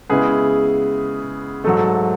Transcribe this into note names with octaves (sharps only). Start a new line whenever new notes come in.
C#3 G#3 B3 E4 G#4 B4
G#2 F#3 A3 A4